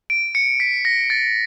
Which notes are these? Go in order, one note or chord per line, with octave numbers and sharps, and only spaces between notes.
D7
C#7
B6
A#6
A6